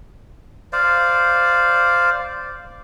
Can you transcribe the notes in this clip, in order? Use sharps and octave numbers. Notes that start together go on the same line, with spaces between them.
C5 D5 F5